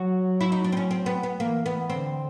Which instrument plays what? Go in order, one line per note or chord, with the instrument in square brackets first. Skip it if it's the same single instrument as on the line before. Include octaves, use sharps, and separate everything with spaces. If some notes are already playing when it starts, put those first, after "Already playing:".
Already playing: [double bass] F#3 [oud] F#4
[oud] E4
D#4
D4
C4
C#4
C4
B3
B3
[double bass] E3 [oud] A#3
[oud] B3
[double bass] D3 [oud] C4